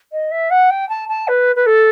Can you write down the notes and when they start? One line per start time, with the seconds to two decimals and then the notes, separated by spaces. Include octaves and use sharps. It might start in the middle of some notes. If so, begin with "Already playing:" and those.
0.12 D#5
0.31 E5
0.50 F#5
0.70 G5
0.89 A5
1.09 A5
1.28 B4
1.56 B4
1.66 A4